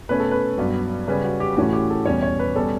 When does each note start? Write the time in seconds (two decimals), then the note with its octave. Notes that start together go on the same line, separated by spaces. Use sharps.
0.09 B2 A3 C#4 B4
0.20 A4
0.31 B4
0.58 G2 F#3 B3
1.07 C#3 G3 C#4 B4
1.24 F#4
1.40 G4
1.57 A2 E3 A3 C#4 F#4
1.73 G4
1.90 A4
2.06 E2 B2 G3 C#4 C#5
2.22 C#5
2.39 B4
2.56 B2 G3 C#4 A4